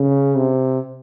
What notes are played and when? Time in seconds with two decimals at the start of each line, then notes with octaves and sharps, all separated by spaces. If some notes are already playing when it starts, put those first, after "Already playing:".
Already playing: C#3
0.35 C3